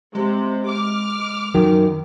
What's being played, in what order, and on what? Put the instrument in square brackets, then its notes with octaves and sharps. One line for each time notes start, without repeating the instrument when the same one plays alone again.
[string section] C3 [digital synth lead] G#3
[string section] D6 F6
[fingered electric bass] F#2 F#3 [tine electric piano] D#3